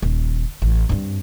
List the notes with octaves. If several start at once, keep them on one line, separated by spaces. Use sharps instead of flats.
D#1
A1
G2 C4